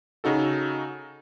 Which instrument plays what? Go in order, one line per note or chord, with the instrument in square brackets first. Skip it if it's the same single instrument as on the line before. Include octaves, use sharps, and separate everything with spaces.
[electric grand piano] C#3 D#4 F#4 A4